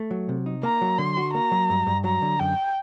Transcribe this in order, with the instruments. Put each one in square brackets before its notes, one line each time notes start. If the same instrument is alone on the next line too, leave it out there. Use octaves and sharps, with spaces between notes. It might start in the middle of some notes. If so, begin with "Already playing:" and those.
Already playing: [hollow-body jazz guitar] A3
F#3
C3
D#4
[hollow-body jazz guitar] A#3 [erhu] A#5
[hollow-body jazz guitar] F#3
[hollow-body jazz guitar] D3 [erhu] C6
[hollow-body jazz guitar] F#4
[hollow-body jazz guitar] A#3 [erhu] A#5
[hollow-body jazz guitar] F#3
G2
G2
[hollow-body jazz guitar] F#3 [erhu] A#5
[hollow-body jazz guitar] D3
[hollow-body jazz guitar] F#2 [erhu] G5